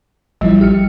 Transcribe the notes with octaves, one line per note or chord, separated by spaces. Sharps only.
A1 F3 G3 E4
G4 F6 C#7